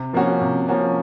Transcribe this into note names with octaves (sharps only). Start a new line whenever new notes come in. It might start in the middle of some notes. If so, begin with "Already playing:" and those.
Already playing: C3
F3 A#3 C#4 F#4
C3
F3 A#3 C#4 F#4